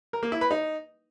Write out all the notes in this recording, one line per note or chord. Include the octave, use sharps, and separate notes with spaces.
A#4
A#3
E4
B4
D#4